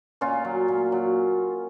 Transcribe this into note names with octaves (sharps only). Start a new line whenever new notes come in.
A#2 C#4 F4
F#3
A#2
F#3